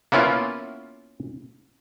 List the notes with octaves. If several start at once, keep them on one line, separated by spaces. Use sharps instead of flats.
A#3 B3 C#4 E4 F4